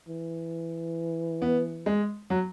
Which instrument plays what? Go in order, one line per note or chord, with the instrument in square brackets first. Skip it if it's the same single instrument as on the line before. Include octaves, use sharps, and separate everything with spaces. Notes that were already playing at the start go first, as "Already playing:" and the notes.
[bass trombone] E3
[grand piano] B3
G#3
F#3